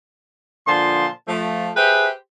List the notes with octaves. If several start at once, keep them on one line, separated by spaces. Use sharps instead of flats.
A#2 D3 F3 A5 C6
F3 A3
G4 G#4 B4 C5 E5